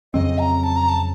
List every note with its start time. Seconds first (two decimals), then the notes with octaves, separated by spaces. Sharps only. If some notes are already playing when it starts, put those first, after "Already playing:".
0.14 F2 C#3 F#3 C4 D#5
0.39 A#5
0.64 A5
0.76 A#5
0.89 A5